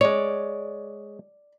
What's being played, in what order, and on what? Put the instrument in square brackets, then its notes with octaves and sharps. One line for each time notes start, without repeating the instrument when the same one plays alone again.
[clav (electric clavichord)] G#3 C#5 [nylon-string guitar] D5